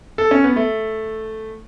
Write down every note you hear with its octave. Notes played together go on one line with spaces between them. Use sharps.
A4
C#4
B3
A3